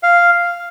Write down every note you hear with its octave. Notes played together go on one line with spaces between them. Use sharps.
F5